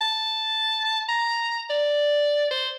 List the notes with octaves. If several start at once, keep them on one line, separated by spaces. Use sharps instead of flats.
A5
A#5
D5
C5